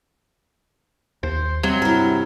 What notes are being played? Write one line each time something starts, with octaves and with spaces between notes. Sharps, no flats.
D#2 C5
C3 F#3 G3
G2 E4 A#4